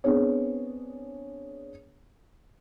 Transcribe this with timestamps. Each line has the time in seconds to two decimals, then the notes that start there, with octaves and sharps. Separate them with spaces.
0.04 B3 C4 D4 G#4 C#5